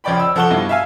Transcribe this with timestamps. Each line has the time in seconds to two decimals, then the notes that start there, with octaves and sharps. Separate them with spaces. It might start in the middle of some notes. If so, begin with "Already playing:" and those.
0.04 C#2 F3 C#4 D5 G5 B5
0.20 E6
0.36 F3 A4 F#5 C#6 G7
0.50 G2 B2 E4 F4
0.69 E5 F5 G#5